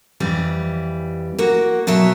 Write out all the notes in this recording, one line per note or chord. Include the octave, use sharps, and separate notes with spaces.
F2 E3 G3
A#3 F#4
B2 F#3 C#5 E5